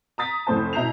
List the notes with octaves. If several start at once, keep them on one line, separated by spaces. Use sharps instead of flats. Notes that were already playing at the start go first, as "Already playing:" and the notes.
A#5 D#6 A6 B6
F1 A2 C5 A5
B2 E4 A#5 G6 C7 F7